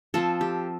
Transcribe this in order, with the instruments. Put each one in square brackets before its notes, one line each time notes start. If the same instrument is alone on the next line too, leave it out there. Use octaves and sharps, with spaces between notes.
[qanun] F3 C4 A4
G4